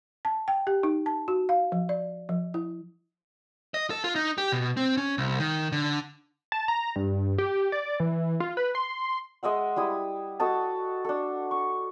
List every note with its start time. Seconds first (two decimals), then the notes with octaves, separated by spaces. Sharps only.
0.25 A5
0.48 G5
0.67 G4
0.83 D#4
1.06 A5
1.28 F#4
1.49 F5
1.72 F3
1.89 D5
2.29 F3
2.54 E4
3.74 D#5
3.90 A4
4.04 F4
4.15 D#4
4.38 G4
4.52 B2
4.77 C4
4.97 C#4
5.18 C2
5.39 D#3
5.72 D3
6.52 A5
6.68 A#5
6.96 G2
7.38 G4
7.72 D5
8.00 E3
8.40 F4
8.57 B4
8.75 C6
9.43 G#3 D#5 E5 F#5
9.76 G3 E4 D#6
10.40 F#4 A4 D#5 A5
11.05 D4 A4
11.51 C#6